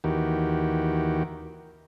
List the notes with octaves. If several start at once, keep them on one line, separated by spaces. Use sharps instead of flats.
D#2 D#3 E3 F#4 G4